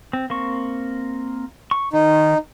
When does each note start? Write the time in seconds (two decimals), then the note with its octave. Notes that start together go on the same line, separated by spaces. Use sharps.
0.13 C4
0.30 A#3 C4 C#6
1.71 C#6
1.93 D#3 D#4